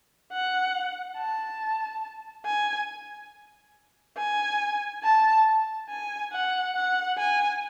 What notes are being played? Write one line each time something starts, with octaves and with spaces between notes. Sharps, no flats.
F#5
A5
G#5
G#5
A5
G#5
F#5
F#5
G#5